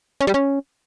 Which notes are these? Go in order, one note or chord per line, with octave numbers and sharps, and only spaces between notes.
C#4
G3
C#4